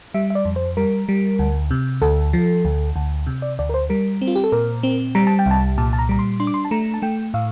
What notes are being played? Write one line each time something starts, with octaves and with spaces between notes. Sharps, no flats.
G3 E5
E5
D5
F2
C5
G3 A#4
G3
D2
C3
D2 A4
F3
D2
D2
C3
D5
D2 D5
A#4
C5
G3 A#4
C4
F4
G4
A4
A#2 A#4
C4
G3 A#5
A5
G5
C2 A5
A#2 A5
A5
A#5
G3 A#5
C6
D4 C6
D6
C6
A5
A3 A#5
A5
A3 G5
A2 F5